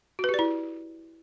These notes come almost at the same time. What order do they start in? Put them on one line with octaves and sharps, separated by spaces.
F#4 B4 G4 D5 E4